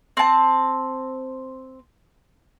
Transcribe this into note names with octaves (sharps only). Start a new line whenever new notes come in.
C4 A5